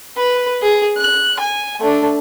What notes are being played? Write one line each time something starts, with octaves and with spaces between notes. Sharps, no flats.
B4
G#4
F#6
G#5
A3 D4